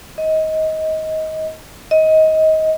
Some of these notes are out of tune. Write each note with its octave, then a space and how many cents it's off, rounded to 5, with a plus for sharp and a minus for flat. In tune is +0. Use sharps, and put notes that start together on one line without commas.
D#5 +20
D#5 +20